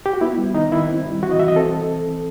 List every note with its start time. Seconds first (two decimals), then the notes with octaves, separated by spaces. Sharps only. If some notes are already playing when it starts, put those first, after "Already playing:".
0.06 G4
0.13 F#4
0.21 B3 E4
0.38 G3
0.54 D#3 D#4
0.72 D#3 E4
0.89 C4
1.06 G3
1.22 E3 F#4
1.31 D#5
1.39 E3 E5
1.48 D#5
1.56 C4 A4